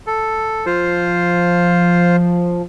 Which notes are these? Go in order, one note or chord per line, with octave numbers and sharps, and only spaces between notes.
A4
F3 F4 C5